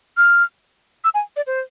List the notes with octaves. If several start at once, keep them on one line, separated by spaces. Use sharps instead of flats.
F6
E6
G#5
D5
C5